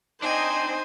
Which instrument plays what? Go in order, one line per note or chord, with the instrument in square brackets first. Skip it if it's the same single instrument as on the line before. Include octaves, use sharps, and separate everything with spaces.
[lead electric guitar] C4 D4 [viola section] D#4 D#5 [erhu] C5 [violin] G#5